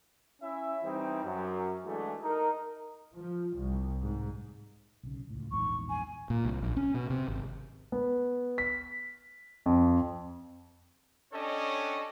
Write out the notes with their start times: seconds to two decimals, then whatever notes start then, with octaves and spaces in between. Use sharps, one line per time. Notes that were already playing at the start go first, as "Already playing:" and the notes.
0.42 C#4 E4 E5
0.83 E3 G3 C4 D#4 E4
1.24 F#2
1.84 E3 G#3 A3 D4 F#4
2.23 D#4 A#4
3.16 F3
3.56 C2
4.02 G#2
5.03 B1 C#3
5.30 C#2 A2
5.52 A#1 E2 G#2 C#6
5.89 G#5
6.30 A#2
6.45 C2
6.62 A#1
6.76 C#4
6.94 B2
7.10 C3
7.28 G#1
7.92 B3
8.58 B6
9.66 F2
11.32 C#4 D4 G4 A4 C#5 D#5